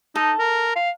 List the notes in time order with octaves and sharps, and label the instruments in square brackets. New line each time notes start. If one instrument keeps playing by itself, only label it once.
[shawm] D#4 [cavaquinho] A4
[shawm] A#4
F5